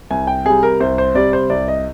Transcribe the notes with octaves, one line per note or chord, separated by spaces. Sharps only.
C2 G#5
G5
C3 G3 G#4
A#4
C2 C5
C5
C3 G3 D5
C5
C2 D5
D#5